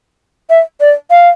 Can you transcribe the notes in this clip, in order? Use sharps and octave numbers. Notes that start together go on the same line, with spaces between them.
E5
D5
F5